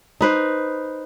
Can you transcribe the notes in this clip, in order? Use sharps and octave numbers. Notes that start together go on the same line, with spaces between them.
D#4 B4 C5